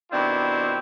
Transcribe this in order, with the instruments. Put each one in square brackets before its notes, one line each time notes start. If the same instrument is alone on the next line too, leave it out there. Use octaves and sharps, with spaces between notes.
[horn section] B2 D#3 C4 D4 E4 G4